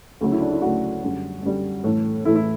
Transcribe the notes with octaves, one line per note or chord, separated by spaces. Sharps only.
D2 C#3 F#3 A3
E4
D4
E4
D2 C#3 F#3 A3 F#4
F#2 D3 G3
F#2 D3 G3
A2 E3 A3
A2 E3 A3 E4
E4